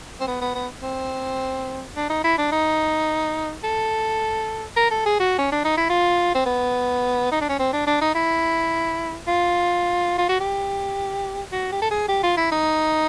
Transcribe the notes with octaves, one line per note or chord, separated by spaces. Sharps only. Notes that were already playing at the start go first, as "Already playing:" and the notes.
C4
B3
B3
B3
C4
D4
D#4
E4
D4
D#4
A4
A#4
A4
G#4
F#4
C#4
D4
D#4
E4
F4
C4
B3
D#4
D4
C#4
C4
D4
D4
D#4
E4
F4
F4
F#4
G4
F#4
G4
A4
G#4
G4
F4
E4
D#4